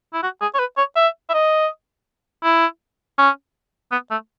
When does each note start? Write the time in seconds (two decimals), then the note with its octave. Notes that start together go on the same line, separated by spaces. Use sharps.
0.14 E4
0.23 F#4
0.42 G#4
0.55 C#5
0.59 B4
0.78 C#5
0.96 E5
1.30 E5
1.34 D#5
2.44 E4
3.18 C#4
3.92 B3
4.11 A3